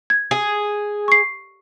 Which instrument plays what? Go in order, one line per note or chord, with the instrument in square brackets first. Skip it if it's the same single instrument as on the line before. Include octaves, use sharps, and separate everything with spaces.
[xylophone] G#6
[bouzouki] G#4
[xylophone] C#6 C7